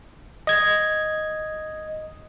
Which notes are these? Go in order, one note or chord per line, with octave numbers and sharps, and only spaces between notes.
D#5 G#6